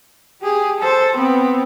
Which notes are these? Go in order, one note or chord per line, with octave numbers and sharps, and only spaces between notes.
G4 G#4
A4 C5
B3 C4